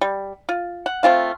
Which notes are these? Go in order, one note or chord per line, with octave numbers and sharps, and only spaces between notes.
G3
F4
F#5
A3 C4 F4 F5